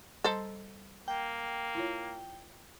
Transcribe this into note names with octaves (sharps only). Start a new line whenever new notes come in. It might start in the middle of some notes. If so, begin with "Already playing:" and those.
G3 A4 C5 D#5 A#5
A#3 G5
E4 F4 C#5